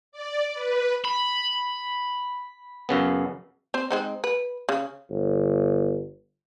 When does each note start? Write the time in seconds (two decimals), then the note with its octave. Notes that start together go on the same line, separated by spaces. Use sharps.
0.12 D5
0.54 B4
1.04 B5
2.89 F#2 C#3 B3
3.74 C4 C5
3.91 G#3 C4 D#4
4.24 B4
4.69 C#3
5.10 G1